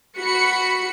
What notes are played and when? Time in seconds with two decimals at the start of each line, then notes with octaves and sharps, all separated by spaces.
0.18 F#4 B5 C#7